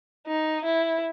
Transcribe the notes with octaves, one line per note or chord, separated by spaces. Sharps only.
D#4
E4